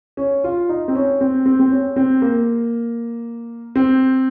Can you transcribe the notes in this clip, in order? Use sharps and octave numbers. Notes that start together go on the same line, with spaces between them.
C#4
F4
D#4
C4
C#4
C4
C4
C4
C#4
C4
A#3
C4